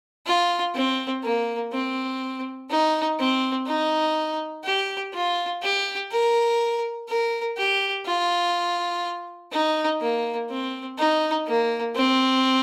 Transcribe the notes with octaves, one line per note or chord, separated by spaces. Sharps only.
F4
C4
A#3
C4
D#4
C4
D#4
G4
F4
G4
A#4
A#4
G4
F4
D#4
A#3
C4
D#4
A#3
C4